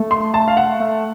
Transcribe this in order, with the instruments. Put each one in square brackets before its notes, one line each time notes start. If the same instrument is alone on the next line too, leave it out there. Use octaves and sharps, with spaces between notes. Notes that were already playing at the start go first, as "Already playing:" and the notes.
Already playing: [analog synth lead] A3
[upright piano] C6
A5
F5
F#5
[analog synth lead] A3